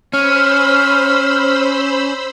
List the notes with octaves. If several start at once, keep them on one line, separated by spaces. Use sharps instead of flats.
C#4 C5 B5 E6 F6